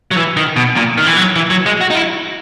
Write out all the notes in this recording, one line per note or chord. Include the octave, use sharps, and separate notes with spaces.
F#3
E3
D#3
B2
A#2
D#3
E3
F#3
E3
F#3
G#3
F#4
D#4
E4